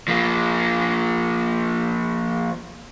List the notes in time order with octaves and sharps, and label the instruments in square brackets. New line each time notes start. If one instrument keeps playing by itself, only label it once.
[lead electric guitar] F3 A#3